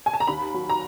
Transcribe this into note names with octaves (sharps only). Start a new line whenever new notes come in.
G#5
A5
A#5
D#2 B5
F#3
A#5